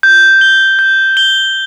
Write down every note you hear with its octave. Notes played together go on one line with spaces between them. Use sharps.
G6
G7
G6
G7